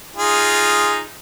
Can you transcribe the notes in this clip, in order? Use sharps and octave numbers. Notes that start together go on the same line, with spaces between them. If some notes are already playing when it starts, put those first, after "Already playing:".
D#4 F4 G#4